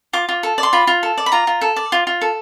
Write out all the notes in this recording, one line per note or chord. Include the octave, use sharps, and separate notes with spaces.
F4 D6
F4
A4
D5
C6
F4 B5
F4
A4
D5
B5
F4 A#5
F4
A4
D5
F4
F4
A4